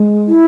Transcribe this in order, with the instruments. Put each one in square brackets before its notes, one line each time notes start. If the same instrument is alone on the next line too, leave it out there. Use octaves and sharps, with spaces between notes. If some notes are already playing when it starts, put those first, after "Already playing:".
Already playing: [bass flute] G#3
[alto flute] E4